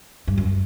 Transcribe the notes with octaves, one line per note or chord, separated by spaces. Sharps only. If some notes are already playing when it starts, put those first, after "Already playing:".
G2
F#2